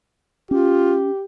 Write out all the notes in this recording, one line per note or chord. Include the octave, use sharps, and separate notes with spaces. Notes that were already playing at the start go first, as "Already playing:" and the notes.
C#4 F4 G4